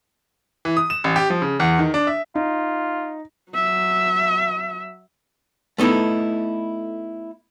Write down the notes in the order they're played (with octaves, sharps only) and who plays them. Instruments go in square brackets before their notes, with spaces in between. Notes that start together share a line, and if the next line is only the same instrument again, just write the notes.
[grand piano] E3
D#6
E7
A1
G4
F3
C#3
E2
D#3
D4
E5
[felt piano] D#4 [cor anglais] F4
[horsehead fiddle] F#3 E5
[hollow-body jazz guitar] A3 B3 D#4 E4 A4